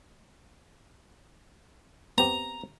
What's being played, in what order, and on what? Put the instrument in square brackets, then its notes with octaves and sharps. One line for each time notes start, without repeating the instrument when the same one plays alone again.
[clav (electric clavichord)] B3 C4 G4 [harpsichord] A#5